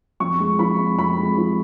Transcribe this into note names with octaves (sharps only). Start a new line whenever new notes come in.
F2 C#6
G#3
F3 B5
F2
F2 B5
G#3
F3